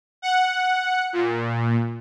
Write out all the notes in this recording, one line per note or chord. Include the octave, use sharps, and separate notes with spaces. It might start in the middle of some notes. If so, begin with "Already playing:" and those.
F#5
A#2